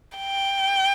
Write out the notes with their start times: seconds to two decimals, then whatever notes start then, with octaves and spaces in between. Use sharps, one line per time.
0.17 G5